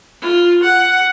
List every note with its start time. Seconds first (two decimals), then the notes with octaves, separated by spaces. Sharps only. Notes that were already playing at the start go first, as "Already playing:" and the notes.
0.22 F4
0.63 F#5